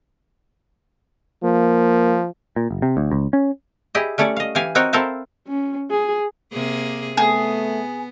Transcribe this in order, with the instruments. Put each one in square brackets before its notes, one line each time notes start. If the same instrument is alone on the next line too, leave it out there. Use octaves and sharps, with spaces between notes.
[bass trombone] F3 [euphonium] A#3
[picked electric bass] A#2
F#1
C3
D2
C#2
C#4
[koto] E4 G4 G#4 D#5
G3 A3 C#4 C#5 D5
D#5 F5
E3 G4 F5 G#5
C4 D#4 F#4 A#4 C#5 D#5
C4 E4 A4 A#4 C5 F5
[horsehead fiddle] C#4
G#4
[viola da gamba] C3 A#3 G#4
[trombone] A3 [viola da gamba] B3 [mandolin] G#4